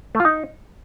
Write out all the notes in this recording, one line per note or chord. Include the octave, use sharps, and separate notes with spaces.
A3
F4
D#4